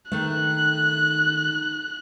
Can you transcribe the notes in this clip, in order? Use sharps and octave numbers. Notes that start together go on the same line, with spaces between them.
D#3 A3 F#6